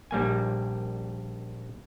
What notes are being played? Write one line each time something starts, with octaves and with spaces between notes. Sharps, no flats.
A#1 G3 A#3 G#5